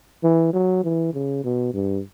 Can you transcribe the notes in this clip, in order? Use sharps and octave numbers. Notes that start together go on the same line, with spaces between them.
E3
F#3
E3
C#3
B2
G2